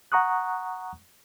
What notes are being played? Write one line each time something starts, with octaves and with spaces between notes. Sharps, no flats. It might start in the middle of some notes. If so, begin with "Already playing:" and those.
F#5 A#5 C#6 D#6 F#6